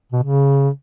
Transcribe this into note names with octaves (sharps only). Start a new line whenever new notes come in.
B2
C#3